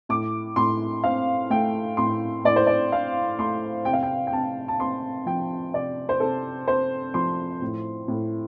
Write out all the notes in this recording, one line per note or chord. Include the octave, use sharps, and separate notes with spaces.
A2 D6
A2 C6
C4 F5
A3 G5
A2 C6
A2 D5
C5
D5
C4 F5
A3 C6
C3 G5
F5
G5
G5
C3 A5
A5
C4 C6
F3 G5
C3 D5
C5
C3 A4
C4 C5
F3 C6
A2
A2